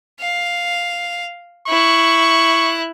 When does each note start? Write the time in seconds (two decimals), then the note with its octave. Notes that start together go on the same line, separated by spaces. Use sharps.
0.20 F5
1.68 E4 C#6 F#6